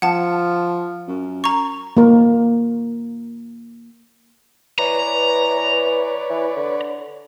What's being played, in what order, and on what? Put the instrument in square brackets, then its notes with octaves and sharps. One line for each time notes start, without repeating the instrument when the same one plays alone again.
[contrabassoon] F3 [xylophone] F#5 A5
[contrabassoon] F#2
[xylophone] A#5 C#6
[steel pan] A#3 A#4
[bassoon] E3 [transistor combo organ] B4 C#5 D5 [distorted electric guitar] A#5
[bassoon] E3
D3